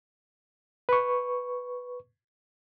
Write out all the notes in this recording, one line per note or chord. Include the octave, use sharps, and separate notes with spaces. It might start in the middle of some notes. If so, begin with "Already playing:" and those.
B4 C#6